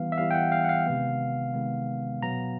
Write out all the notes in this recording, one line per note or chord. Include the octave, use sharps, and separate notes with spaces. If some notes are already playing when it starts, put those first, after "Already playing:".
Already playing: E3 G3 B3 F5
E5
E3 G3 B3 F5
G5
F#5
F5
F#5
F5
C3 D#3 G#3 B3
C3 D#3 G#3 B3
B2 F#3 B3 A#5